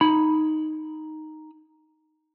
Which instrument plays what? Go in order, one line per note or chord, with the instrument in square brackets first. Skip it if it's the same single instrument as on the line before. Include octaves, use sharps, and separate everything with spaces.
[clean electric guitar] D#4 B5